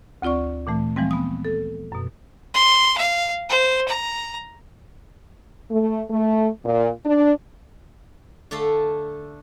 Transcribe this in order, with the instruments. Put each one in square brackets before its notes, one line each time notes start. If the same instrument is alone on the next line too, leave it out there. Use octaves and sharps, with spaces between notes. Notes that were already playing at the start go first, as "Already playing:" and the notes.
[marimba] D2 C4 F4 D5 C#6
A#2 E3 A3
E3 F3 G3 G#3 C4
B3 D#6
A4
F#2 B2
[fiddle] C6
F5
C5
A#5
[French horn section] A3
A3
A#2
D4
[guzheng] D3 A3 D4 A4 F5